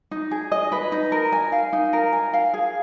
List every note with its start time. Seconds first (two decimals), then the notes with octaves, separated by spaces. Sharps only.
0.11 D#4
0.31 G#4
0.52 D#5
0.72 B4
0.92 D#4
1.12 A#4
1.32 G#5
1.52 F5
1.73 D#4
1.93 A#4
2.13 G#5
2.33 F5
2.54 G#4